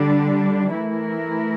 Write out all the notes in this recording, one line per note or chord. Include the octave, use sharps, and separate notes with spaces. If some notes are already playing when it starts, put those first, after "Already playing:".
Already playing: D3 G3 D4
E3 A3 E4 A#4